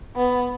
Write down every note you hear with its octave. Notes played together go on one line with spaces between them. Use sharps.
B3